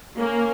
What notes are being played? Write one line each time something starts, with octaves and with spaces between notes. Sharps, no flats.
A#3 C#4